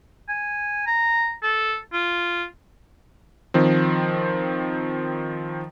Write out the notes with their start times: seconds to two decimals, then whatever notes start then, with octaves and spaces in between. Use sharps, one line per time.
0.29 G#5
0.87 A#5
1.43 A4
1.93 F4
3.54 D#3 F3 C4